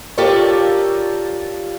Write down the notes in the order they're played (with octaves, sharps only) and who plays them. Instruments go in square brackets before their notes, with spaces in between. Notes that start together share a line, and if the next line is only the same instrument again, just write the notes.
[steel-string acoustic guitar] F4 G4 A4 A#4 C#5 D5